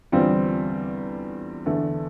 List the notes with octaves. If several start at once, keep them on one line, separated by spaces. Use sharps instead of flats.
E2 D3 G3 C4 F4
E2 D3 A3